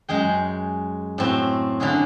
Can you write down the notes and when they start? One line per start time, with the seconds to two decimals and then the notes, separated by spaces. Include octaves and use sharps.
0.09 F#2 G#3 G#4 G5
1.18 A2 C4 F#4
1.80 D3 C#4 E4 F#4 G#4